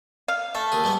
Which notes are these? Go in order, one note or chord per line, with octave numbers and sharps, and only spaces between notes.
F5
A3 E5
D#2 G#4
G#2 G3 B3